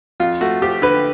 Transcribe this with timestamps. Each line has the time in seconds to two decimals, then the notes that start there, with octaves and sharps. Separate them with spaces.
0.20 F2 F4
0.41 A3 F#4
0.62 F3 G4
0.82 D3 B4